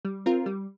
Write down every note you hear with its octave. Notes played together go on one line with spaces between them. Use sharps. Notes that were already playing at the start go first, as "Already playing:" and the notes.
G3
C4 F4 A#4
G3